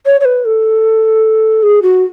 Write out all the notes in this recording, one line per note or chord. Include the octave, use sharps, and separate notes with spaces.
C#5
C#5
B4
A4
G#4
F#4